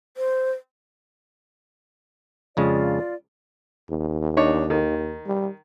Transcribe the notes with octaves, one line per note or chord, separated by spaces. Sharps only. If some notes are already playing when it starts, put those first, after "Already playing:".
C5
F2 C#3 G#3 F4 D5
D#2
D4 D#4 C#5
D#3
G3